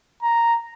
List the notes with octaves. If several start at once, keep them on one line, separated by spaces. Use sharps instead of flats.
A#5